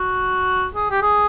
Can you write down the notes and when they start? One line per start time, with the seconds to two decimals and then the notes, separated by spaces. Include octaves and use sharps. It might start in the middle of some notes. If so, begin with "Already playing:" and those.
Already playing: F#4
0.74 G#4
0.91 G4
1.02 G#4